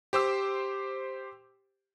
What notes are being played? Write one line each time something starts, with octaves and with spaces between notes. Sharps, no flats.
G4 C5 D6 E6